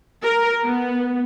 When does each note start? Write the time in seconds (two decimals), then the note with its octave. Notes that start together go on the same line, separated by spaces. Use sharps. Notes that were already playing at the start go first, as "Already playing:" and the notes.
0.23 A#4
0.63 B3